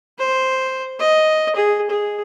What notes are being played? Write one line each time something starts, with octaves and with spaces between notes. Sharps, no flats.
C5
D#5
G#4
G#4